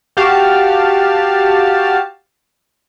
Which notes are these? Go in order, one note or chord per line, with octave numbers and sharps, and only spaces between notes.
F#4 G4 F5 A5